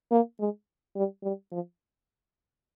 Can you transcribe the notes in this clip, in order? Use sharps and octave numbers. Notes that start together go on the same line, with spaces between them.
A#3
G#3
G3
G3
F3